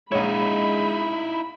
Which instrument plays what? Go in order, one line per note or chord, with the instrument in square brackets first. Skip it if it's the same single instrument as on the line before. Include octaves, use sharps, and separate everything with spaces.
[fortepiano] A#1 C#5 [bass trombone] G#3 [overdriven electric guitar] D#4 E4 [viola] B5